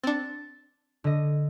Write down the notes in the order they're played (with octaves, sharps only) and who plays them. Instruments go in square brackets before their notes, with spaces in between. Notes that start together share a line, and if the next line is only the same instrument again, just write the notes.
[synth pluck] C4 D4 [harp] A6 C#7
[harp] D3 D#5